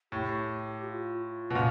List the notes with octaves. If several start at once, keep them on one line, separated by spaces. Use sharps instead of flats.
A2 G4
F4
B2
A#2 C#4